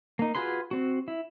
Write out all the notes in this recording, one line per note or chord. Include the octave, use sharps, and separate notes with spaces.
A#3 D#4
F4 F#4 G#4 B4 C6
C4 F#4
E4